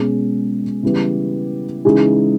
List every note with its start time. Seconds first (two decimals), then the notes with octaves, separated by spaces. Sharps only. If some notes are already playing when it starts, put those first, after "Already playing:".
Already playing: B2 G#3 C#4 G#4
0.83 C#3 E3 G3 B3 G4
1.85 C#3 E3 G#3 D#4 G#4